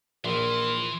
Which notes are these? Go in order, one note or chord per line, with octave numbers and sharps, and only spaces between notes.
A#1 E3 A#4 C6